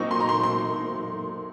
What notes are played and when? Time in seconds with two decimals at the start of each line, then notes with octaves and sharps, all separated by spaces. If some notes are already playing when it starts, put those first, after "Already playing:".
Already playing: A#2 F#3 C4 D#4 C#6
0.11 C6
0.20 A#5
0.29 C6
0.43 C6